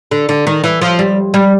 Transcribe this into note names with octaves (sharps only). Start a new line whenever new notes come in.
D3
D3
D#3
E3
F3
G3
G3